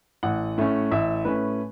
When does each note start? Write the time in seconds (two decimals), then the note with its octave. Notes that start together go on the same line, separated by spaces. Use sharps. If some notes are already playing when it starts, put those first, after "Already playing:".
0.23 A1 F#5
0.58 A2 A3 C#4
0.91 A1 E5
1.25 A2 A3 C#4 B4